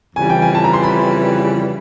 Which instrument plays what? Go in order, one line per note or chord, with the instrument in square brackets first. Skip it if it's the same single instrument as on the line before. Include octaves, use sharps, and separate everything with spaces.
[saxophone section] F2 C#3 E3 G3 [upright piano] G#5
[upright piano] G5
G#5
A5
A#5
C6
B5